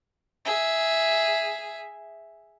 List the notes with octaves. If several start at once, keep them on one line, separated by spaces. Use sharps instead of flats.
G#4 E5